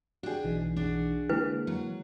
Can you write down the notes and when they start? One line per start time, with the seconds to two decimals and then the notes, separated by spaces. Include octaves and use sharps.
0.23 D4 F#4 G#4 G5
0.44 B1 E3 D#4
0.76 D4 F#4 G#4
1.29 D3 G#3 A#3 E4 B4
1.67 F#3